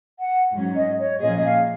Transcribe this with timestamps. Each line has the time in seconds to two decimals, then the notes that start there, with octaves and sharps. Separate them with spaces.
0.19 F#5
0.53 G#2 F#3 C#4
0.76 D#5
0.99 C#5
1.21 A#2 F3 A#3 C#4 G#4 D#5
1.44 F5